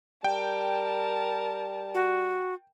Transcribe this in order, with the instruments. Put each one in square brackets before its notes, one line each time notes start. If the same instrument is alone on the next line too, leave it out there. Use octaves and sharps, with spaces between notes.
[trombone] G3 [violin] A#4 A5 [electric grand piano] G5
[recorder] F#4